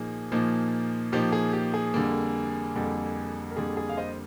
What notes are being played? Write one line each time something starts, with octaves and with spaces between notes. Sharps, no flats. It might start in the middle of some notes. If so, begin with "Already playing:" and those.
Already playing: A#2 F3 A#3 D#4 G#4
A#2 F3 A#3 D#4
A#2 F3 A#3 D#4 G4
G#4
G4
G#4
F2 D3 G3 A#3
F2 D3 G3 A#3
A#4
F2 D3 G3 A#3 G#4
G#4
F5
C5 D#5